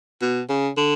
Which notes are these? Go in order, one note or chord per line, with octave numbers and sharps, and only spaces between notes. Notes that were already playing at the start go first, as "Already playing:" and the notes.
B2
C#3
D3